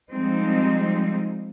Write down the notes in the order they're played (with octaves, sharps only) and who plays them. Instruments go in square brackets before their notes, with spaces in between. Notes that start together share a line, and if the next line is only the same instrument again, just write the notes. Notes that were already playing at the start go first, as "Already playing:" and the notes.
[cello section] F3 G3 G#3 C4 D#4